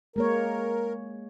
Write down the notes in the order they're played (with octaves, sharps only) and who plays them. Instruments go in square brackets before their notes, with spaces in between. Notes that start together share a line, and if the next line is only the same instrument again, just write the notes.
[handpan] G#3 A#3 C#5 [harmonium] A#4